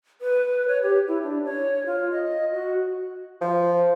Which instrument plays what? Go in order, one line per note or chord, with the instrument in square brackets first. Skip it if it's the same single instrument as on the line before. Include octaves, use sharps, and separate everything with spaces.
[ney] B4
C#5
G4
E4
D4
C#5
F4
D#5
F#4
[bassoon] F3